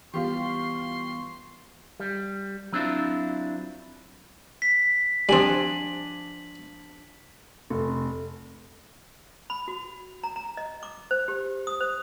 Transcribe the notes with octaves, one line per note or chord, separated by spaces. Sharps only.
E3 G3 B3 F4 G4 C6 C#6
G3
F#3 C4 D4 E4 F4
B6
F3 G3 C4 D4 G#5 F#7
F1
B5
F#4
A#5
A#5
D#5
D6
C5
G4
D#6
C5